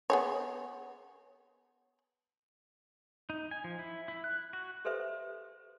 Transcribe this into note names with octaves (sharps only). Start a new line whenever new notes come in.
B3 G#4 C#5
D#4
G#5
F3
E4
E4
F#6
F#4
G4 A4 B4 C5 E5